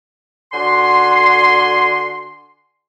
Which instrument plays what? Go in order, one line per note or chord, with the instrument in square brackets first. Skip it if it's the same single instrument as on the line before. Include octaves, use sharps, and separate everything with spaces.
[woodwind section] D3 F#4 G#5 C6